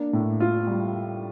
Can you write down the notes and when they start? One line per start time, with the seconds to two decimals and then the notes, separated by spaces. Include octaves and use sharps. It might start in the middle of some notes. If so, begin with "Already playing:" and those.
Already playing: A#3 D4
0.13 A2
0.40 F4
0.67 G3